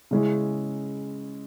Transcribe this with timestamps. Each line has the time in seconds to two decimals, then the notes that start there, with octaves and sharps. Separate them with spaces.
0.11 C#3 G#3 C#4 E4